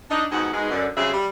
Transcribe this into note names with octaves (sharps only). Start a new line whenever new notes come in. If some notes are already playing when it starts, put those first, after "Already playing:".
D4 D#4
F2 G#2 B2 D#4 F#4
G#2 B2 G#3
F#2 D3
C#3 F#3 G3 C4 G#4 E5
G3